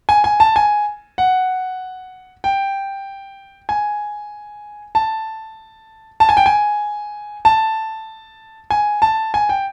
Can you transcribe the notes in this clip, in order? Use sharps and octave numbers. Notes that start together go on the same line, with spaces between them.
G#5
G#5
A5
G#5
F#5
G5
G#5
A5
A5
G#5
G5
G#5
A5
G#5
A5
G#5
G5